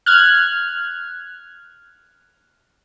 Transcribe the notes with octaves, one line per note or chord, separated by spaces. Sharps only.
F6 F#6 G#6